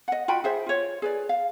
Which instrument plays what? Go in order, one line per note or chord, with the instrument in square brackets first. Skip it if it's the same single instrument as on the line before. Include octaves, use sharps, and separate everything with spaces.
[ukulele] D#5 F#5
F4 F#4 G5 B5
G#4 C5 E5
F4 C#5
G#4 B4 D5
F5